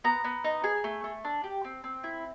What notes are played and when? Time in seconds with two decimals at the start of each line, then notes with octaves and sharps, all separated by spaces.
0.04 B3 A#5
0.24 B3
0.44 D#4
0.64 G#4
0.84 A3
1.04 A3
1.24 D4
1.44 G4
1.65 C4
1.84 C4
2.04 E4